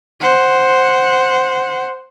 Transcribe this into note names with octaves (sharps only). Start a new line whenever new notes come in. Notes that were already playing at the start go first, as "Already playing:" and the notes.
C5 F#5